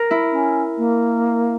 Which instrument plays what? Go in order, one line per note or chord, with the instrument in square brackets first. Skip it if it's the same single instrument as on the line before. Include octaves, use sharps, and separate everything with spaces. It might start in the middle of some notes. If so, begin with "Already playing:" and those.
Already playing: [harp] A#4
E4
[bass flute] C#4
A#3